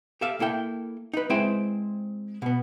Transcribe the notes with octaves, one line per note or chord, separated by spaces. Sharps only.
G4 A4 E5 F5
A#3 E4 A4 G5
D#4 B4
G#3 C4 E4 B4 C5 G5
B2 B3